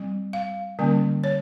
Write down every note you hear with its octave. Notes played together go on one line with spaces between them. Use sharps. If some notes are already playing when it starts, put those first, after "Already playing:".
Already playing: G3 C4
F5
D3 G3 A#3 C#4
C#5